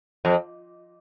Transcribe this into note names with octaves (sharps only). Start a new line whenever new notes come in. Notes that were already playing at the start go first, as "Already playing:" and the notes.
F2